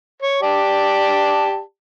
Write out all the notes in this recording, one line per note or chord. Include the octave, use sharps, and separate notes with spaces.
C#5
G4 D5 A5